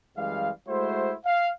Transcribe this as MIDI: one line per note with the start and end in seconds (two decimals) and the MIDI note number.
0.17 0.51 42
0.17 0.51 52
0.17 0.51 55
0.17 0.51 56
0.17 0.51 77
0.68 1.14 56
0.68 1.14 57
0.68 1.14 64
0.68 1.14 66
0.68 1.14 72
1.26 1.50 77